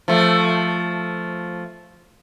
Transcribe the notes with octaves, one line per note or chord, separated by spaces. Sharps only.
F3 A3